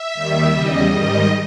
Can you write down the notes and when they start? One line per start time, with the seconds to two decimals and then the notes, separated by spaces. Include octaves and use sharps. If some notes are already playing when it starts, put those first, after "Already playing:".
Already playing: E5
0.14 D#2 D#3 G3
0.51 E2 C#3 G3 D#5
0.89 G#2 D#3 G3 D#5